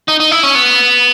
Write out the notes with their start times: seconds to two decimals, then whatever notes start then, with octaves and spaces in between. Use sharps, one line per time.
0.08 D#4
0.20 D#4
0.31 E4
0.43 C#4
0.55 B3